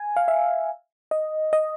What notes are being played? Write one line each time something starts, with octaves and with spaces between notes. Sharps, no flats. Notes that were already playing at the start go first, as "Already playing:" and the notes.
Already playing: G#5
F5
E5
D#5
D#5